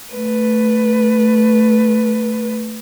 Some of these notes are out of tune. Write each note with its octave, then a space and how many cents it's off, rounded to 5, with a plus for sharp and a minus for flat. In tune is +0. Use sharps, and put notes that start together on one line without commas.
A3 +0 B4 +0